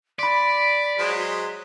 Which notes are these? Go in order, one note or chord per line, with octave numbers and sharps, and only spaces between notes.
D5 B5 C6 B6
F#3 G#3 C5